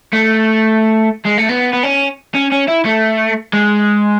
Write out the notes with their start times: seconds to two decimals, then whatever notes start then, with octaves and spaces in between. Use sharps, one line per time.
0.13 A3
1.25 G#3
1.37 A3
1.49 B3
1.73 B3
1.83 C#4
2.35 C#4
2.52 C#4
2.68 E4
2.85 A3
3.53 G#3